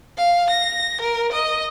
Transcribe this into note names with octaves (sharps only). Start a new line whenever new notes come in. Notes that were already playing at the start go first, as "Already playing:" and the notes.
F5
A#6
A#4
D#5